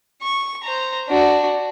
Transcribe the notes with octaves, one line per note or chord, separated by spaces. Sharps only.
C#6
C5 A#5
D4 F#4